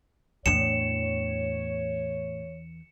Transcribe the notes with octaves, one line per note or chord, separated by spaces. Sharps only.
E2 A2 D4 C#5 C#7 E7